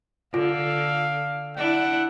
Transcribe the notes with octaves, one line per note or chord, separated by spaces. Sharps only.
D3 F4 F5
D4 E4 F#5